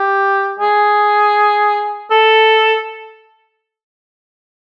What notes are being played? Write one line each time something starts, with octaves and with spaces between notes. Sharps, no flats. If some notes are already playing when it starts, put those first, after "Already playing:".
Already playing: G4
G#4
A4